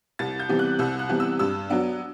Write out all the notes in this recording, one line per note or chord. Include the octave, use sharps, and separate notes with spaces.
C2 A6
G6
C3 E3 G3 B3
F#6
C2 E6
F#6
C3 E3 G3 B3
E6
G2 E6
F#3 B3 D4